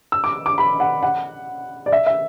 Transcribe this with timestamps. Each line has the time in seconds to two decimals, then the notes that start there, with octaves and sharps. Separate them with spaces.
0.12 E6
0.24 D6
0.46 D6
0.58 B5
0.80 F#5
1.03 F#5
1.86 D5
1.92 E5
2.07 E5